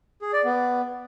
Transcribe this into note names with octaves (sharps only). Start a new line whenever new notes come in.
G#4
D5
B3